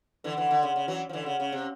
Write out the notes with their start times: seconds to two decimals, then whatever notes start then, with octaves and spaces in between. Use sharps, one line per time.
0.24 D3 E3
0.37 D3 E3
0.51 D3
0.63 C#3
0.76 C#3
0.88 E3 F#3
1.09 F3
1.13 D3 E3
1.26 C#3
1.40 C#3
1.52 C3